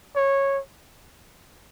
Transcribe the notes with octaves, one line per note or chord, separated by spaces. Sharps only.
C#5